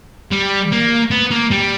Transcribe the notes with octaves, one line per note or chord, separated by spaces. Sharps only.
G3
A#3
B3
A#3
G3